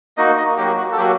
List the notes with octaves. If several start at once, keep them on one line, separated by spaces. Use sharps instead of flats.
A#3 D#4 F#4 D#5
D#5
F#3 A#3 F#4 G4
F#4
A4
F#3 A#3 F#4 G4